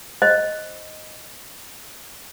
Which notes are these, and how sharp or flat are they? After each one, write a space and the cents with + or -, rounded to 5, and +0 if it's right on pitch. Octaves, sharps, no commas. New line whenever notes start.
C5 +0 D#5 +0